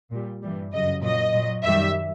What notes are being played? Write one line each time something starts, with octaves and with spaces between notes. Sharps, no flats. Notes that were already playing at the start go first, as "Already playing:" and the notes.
A#2 G3
G2 E3 G3
F#2 C#3 F#3 D#5
A#2 F#3 D#5
A#2 F#3
F#2 D#3 G3 E5